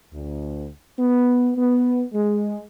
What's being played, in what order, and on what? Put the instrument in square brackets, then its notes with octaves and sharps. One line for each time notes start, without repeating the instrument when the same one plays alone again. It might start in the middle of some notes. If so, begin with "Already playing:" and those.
[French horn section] D2
B3
B3
G#3